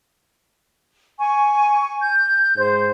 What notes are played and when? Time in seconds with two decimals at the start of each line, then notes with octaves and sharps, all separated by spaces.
1.19 G#5 C#6
2.00 G6
2.58 G#2 C5